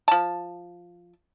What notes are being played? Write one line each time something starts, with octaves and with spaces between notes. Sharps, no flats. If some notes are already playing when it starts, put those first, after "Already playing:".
F3 A5